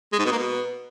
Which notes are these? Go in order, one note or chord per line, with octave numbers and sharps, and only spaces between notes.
G#3
G#2
B2
A#3
B2